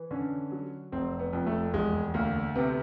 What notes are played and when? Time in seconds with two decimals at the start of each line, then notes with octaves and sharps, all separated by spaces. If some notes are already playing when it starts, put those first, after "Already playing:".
Already playing: E3
0.11 D3 C#4
0.52 F#3
0.92 F1 C4
1.19 B3
1.33 F2
1.46 A3
1.74 E1 G#3
2.14 D2 A#3
2.56 C3 B3